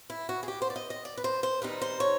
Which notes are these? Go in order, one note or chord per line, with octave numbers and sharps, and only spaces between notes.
E4
F#4
G#4
G4
C5
D5
D#5
D#5
D5
B4
C5
C5
C3 D#3 G3 C4 D#4 B4
C5
C#5